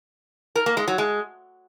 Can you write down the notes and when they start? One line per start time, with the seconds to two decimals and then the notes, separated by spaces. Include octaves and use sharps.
0.56 A#4
0.66 A#3
0.77 G#3
0.88 F#3
0.98 G#3